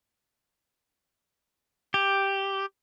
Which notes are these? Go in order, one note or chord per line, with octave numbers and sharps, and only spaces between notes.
G4